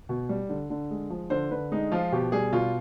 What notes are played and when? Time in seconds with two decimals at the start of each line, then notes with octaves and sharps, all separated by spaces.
0.09 B2
0.29 G3
0.49 D3
0.70 D3
0.91 G#3
1.10 F3
1.30 D3 C5
1.51 D3 B4
1.72 G#3 D#4
1.92 F3 F4
2.12 B2 G4
2.32 G3 G#4
2.53 B2 F4